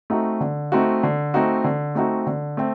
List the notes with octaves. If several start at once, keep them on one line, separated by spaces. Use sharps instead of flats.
A3 C4 D#4 F#4
D3
A3 C4 D#4 F#4
D3
A3 C4 D#4 F#4
D3
A3 C4 D#4 F#4
D3
A3 C4